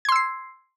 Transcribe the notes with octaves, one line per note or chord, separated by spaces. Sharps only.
C6 E6 G#6 C7